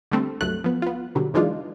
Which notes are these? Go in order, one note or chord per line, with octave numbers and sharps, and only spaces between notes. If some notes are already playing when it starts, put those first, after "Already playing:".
D3 G3 A3 C4
C#2 G2 F#3 A3 F#6
F3 B3
B3 F4
B2 D3 F#3 G3
F#2 E3 G#3 D4 D#4 F4